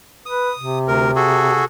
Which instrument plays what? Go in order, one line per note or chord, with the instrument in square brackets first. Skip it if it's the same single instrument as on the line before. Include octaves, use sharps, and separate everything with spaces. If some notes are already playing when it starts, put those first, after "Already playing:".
[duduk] B4 [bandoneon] D#6
[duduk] C3
[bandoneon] D2 A#4
F#4 G#4 A4